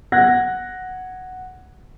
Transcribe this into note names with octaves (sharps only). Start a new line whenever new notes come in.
F#5 F#6 G#6 A#6